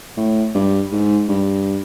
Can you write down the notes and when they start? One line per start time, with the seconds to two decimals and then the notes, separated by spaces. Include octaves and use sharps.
0.17 A2
0.55 G2
0.92 G#2
1.28 G2